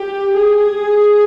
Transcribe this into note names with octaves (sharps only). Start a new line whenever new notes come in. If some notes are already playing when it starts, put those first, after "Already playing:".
Already playing: G4
G#4